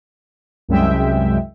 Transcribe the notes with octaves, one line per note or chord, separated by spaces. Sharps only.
C2 F#2 G#3 E5 G5